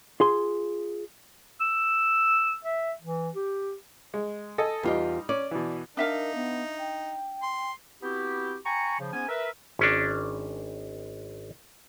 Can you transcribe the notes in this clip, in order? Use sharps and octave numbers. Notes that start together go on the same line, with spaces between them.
F4 G#4 C6
E6
E5
E3
G4
G#3
A4 D#5 G#5
E2 G3 D#4 F4 G4
C#4 D5
B2 E3
D4 D#4 A#4 E5 F5
B3
G5
C6
B3 C4 E4 F#4 G4
G5 G#5 A#5 B5 C#6
C#3 F3
G#2 B3 C#4 G#5
A#4 B4 E5
G#1 C#4 D4